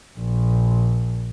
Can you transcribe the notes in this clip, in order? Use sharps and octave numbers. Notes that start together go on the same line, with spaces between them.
A#1